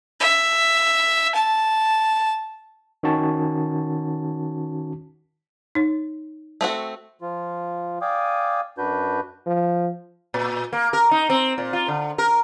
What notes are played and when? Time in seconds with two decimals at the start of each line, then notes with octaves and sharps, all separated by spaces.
0.20 E5
1.35 A5
3.03 D#3 C#4 F#4 A5
5.75 D#4 C#5
6.61 A3 C4 F#4
7.21 F3 F4
8.01 D5 F5 G5 G#5 D6 D#6
8.78 F#2 D4 F#4 B4 G6
9.47 F3
10.34 A#2
10.73 A#3
10.93 A#4
11.11 D#4
11.30 C4
11.58 A#2
11.73 F4
11.88 D3
12.18 A#4